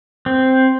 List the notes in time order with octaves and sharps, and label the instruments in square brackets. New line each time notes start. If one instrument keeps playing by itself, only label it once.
[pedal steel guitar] C4